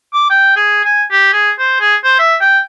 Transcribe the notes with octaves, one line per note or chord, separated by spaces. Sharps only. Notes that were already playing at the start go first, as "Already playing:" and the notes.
D6
G5
G#4
G#5
G4
G#4
C5
G#4
C5
E5
G5